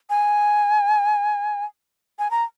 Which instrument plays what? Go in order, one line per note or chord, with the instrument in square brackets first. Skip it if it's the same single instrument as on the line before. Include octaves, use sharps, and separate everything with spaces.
[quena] G#5
G#5
A#5